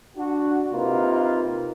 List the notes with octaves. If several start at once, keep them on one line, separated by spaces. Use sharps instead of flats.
D4 F#4
C3 A#3 D#4 F4 B4